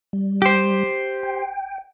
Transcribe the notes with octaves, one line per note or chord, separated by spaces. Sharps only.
G3
G4 C5
G5